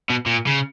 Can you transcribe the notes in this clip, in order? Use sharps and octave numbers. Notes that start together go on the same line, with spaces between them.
B2
A#2
C#3